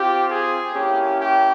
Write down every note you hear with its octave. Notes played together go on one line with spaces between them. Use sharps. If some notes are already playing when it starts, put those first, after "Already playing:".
Already playing: C4 F4 G4
G#4
A#3 C#4 E4 G4
G4